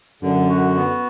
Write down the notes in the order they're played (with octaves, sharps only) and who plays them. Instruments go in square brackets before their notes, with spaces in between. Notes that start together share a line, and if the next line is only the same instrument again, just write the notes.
[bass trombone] F#2 [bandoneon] D3
[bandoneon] F#4
B3